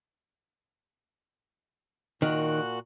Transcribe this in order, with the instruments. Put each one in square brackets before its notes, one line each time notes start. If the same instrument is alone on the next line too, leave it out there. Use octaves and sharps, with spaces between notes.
[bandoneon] A#2 F#4 F#6 [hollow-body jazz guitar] D#3